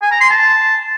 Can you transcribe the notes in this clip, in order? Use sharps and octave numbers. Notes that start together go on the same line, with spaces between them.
G#5
A#5
C6
A5